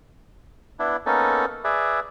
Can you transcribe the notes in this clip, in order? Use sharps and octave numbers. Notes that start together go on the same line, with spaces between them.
B3 D4 E4
A#3 B3 C#4 D#4 A4
G#4 B4 D5 E5